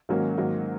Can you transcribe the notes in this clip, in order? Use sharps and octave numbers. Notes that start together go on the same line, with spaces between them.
G#2 D#3 F#3 A#3 C#4
G#2 D#3 F#3 A#3